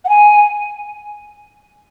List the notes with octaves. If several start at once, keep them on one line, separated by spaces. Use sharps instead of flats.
F#5
G#5